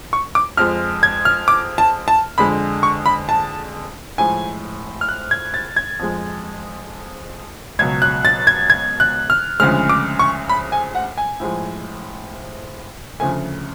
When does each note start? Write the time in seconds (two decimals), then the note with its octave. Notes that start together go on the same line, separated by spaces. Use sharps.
0.13 C#6
0.35 D6
0.57 F2 F3 G#3 F6
1.03 G#6
1.25 F6
1.48 D6
1.78 A5
2.08 A5
2.38 F2 D3 G#3 B5
2.83 C#6
3.06 B5
3.29 A5
4.18 A2 F3 G#3 G#5
5.01 F6
5.09 F#6
5.31 G#6
5.54 A6
5.76 G#6
5.99 F2 F3 G#3
7.79 C#2 B2 F#3 G#6
8.02 F#6
8.25 A6
8.47 G#6
8.70 G#6
9.00 F#6
9.30 F6
9.60 D2 C#3 F3 G#3 F6
9.89 D6
10.19 C#6
10.49 B5
10.72 G#5
10.95 F#5
11.18 G#5
11.40 A2 F3 G#3
13.20 D2 C#3 F3 A3 G#5